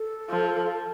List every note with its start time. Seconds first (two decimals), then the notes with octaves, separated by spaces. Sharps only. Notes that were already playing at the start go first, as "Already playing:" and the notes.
Already playing: A4
0.30 F3